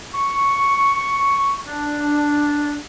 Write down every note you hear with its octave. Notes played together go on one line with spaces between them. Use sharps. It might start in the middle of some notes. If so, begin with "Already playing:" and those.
C#6
D4